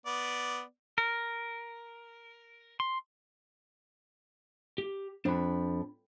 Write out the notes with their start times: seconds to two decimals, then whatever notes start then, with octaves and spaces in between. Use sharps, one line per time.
0.06 B3 D5
0.98 A#4
2.80 C6
4.78 G4
5.25 F2 D4 B5